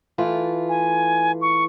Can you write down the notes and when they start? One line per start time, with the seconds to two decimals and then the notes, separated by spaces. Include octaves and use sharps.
0.18 E3 A3 F4
0.69 G#5
1.41 C#6